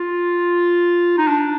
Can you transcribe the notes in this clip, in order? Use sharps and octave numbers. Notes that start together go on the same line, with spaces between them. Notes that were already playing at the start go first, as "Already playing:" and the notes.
Already playing: F4
D#4
D4